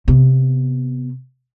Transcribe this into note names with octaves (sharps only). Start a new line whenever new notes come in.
C3 B3